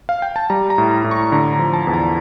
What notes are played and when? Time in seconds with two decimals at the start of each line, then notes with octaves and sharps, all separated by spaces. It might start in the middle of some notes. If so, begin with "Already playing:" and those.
0.09 F5
0.22 G5
0.36 A5
0.50 G3 A#5
0.70 A#5
0.78 A2
0.91 A#5
1.04 A2
1.11 C#6
1.32 D3 A#5
1.53 A#5
1.59 F3
1.73 A5
1.87 E2
1.94 A#5